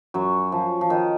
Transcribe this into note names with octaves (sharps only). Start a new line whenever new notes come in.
F#2 F#3
F3
F3
D#3